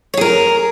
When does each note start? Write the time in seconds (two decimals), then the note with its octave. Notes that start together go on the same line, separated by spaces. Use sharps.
0.14 C#5
0.17 G#4
0.21 A#4